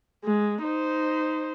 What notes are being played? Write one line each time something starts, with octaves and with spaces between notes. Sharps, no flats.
G#3
D#4 C5